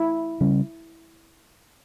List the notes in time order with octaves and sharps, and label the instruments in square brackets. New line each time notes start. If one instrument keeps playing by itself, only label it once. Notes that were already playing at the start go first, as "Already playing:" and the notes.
Already playing: [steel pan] E4
[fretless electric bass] C#3 G3 C#4